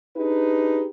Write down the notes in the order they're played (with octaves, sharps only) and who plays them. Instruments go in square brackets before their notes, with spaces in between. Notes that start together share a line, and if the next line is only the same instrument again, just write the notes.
[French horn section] D4 D#4 G4 G#4 B4